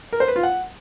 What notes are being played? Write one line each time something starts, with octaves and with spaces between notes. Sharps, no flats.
A#4
C5
B4
F4
F#5